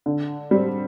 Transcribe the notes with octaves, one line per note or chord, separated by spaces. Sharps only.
D3
G3 C4